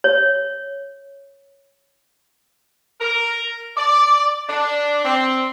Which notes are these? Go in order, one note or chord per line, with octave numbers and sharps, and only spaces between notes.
C#5
A#4
D5
D4
C4